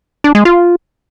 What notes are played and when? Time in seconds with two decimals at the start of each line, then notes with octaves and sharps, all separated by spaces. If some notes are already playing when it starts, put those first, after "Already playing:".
0.24 D4
0.35 G#3
0.45 F4